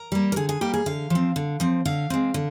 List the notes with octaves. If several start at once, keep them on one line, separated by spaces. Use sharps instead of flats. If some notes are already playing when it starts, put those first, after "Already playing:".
Already playing: A#4
G3 A#3
A#4
D3 G#4
G#4
G3 A#3 G4
G#4
D3 F5
F3 C4
D3
F3 C4
D3 F5
G#3 C4
D3